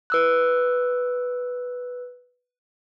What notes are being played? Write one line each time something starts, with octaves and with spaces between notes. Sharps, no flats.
B4 E6 F#6